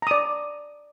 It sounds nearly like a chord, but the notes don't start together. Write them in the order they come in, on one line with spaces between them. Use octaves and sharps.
A#5 D#6 D5